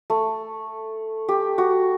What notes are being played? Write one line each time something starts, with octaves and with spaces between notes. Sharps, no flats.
A3
G4
F#4